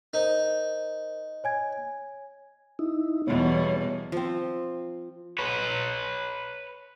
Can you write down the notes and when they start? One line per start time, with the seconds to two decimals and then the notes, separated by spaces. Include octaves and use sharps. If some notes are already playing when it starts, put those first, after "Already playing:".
0.14 D#4 A#4 C5
1.44 C#5 G#5 G#6
2.79 D#4 E4
3.27 E2 B2 G3 B3 C#5
4.12 F3 C4
5.39 B4 C#5